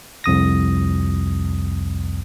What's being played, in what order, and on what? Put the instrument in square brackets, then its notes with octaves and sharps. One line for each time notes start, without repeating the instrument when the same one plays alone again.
[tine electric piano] C2 F2 D#6 A#6